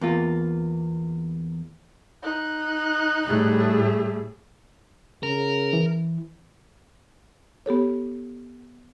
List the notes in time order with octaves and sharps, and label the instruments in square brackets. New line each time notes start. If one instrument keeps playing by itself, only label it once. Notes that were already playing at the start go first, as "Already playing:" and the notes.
[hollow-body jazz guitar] E2 A#3 F4
[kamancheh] D#4 F#6
[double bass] A2 G3 [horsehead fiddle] A3 G#4
[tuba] C#3 [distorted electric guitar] A#4
[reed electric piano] E3
[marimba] B3 G4 A4 C#5